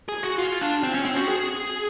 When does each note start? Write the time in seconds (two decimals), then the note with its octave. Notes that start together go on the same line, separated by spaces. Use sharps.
0.09 G#4
0.23 F#4
0.38 F4
0.61 D4
0.83 C4
0.94 C#4
1.05 C4
1.16 F#4
1.29 G#4